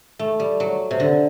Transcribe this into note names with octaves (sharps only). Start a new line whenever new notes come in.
A3
G3
F#3
C3
D3